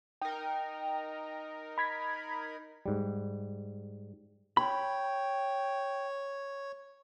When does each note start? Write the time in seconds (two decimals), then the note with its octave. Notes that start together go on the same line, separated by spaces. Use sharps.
0.22 D#4 A#4 G5
1.78 B5 G#6 B6
2.86 G#2 G3
4.57 C#5 G5 B5